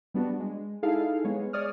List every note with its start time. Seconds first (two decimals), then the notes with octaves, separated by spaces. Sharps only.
0.14 G3 B3 D4 F#4
0.40 G#3
0.83 D#4 E4 G#4 A4 F5
1.24 G#3 B3 G#4 C#5
1.53 G#4 C#5 D5 D#6 F6